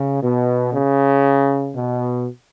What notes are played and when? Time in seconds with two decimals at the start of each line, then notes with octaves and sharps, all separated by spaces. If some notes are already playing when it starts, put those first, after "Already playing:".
Already playing: C#3
0.22 B2
0.72 C#3
1.72 B2